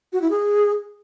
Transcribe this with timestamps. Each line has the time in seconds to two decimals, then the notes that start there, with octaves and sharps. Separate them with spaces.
0.13 F#4
0.22 E4
0.30 G#4